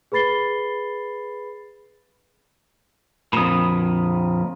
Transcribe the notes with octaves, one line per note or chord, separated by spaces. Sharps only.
G#4 B4 B5 A6 C7 G7
F2 A#2 B5 D#6